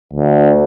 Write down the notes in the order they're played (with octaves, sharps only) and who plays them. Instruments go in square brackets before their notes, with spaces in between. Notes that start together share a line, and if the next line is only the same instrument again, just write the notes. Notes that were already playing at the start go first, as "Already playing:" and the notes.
[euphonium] D2